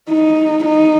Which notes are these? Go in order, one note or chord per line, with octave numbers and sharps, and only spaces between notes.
D#4
D#4